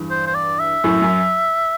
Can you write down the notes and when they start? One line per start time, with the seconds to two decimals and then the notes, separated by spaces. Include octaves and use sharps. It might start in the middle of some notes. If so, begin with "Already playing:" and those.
Already playing: E2 G2
0.10 C5
0.27 C5
0.35 D5
0.60 E5
0.84 F#2 A2
1.02 F#2